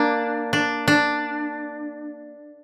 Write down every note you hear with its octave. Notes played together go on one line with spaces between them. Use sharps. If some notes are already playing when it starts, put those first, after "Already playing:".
Already playing: A#3 D4
D4
D4